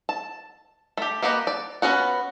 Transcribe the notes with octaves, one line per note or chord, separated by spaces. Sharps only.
A5
A3 G4
A#3 B3 F#4 G4 D#5
D5
B3 C#4 F#4 F#5